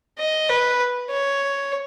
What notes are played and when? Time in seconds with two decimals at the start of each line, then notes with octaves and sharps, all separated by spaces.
0.19 D#5
0.49 B4
1.10 C#5